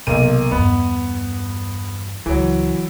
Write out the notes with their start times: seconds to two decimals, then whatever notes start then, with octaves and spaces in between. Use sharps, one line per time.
0.07 B1 C3 D#3 A#3 D#7
0.51 E2 G2 B3
2.26 C#2 E3 F#3